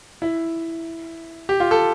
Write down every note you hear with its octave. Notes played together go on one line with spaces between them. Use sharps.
E4
G4
F4
A4